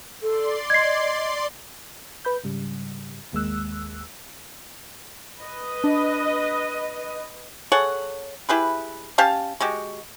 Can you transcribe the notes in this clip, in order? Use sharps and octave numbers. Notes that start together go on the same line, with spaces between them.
A4 D5 C6
D#5 G#6 C7
B4 B5 G6
G#2 C#3 G3
G1 D#2 G#3 A#3 E6 F#6
B4 D#5
D4
G#4 A4 C#5 F#5
E4 G4 G#4 B4
C#4 G4 F5 A5
G#3 F#4 G4